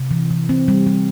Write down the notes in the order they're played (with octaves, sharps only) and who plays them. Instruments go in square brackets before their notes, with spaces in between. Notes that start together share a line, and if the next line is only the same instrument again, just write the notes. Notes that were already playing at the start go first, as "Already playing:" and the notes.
Already playing: [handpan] C3
E3
E3
C4
G3
G3